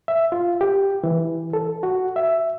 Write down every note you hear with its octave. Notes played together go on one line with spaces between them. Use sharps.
E5
F4
G4
E3
A4
F#4
E5